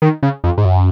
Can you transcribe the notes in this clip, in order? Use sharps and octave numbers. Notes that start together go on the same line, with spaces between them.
D#3
C#3
F2
G#2
F#2